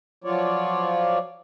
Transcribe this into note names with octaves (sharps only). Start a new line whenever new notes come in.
F3 F#3 F4 C#5 D5